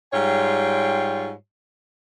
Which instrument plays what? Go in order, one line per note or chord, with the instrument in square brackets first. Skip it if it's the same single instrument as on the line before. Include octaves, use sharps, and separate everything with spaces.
[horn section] G#2 G3 F4 C#5 G5